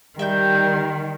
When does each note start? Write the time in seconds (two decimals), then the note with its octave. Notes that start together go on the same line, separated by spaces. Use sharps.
0.19 D#3 G3 E5 G5 G6